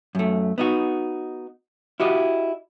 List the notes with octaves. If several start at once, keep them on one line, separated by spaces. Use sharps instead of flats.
F#2 A3
B3 D#4 F#4
E4 F#4 G4 D#5